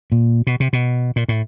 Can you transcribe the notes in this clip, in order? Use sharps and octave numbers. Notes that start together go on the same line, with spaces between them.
A#2
B2
C3
B2
A#2
A2